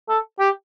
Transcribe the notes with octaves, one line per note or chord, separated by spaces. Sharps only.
A4
G4